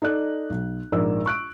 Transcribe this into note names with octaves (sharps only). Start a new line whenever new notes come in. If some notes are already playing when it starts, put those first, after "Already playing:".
D#4 A4 D5 F#6
B1
A#1 G#2 A#4 D5 E6
C#6 F#6 D7